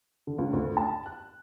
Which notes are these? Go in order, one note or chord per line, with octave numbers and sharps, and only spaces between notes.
D3
C#2
D2
A5
F#6